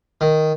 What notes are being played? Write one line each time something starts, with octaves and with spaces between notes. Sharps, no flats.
D#3